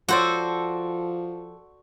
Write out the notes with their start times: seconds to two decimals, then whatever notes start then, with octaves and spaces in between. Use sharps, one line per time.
0.09 F3 F#4 A4 C5 D5